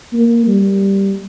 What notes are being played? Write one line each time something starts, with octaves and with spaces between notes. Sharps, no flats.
A#3
G3